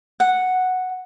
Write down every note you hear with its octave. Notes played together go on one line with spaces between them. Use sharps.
F#5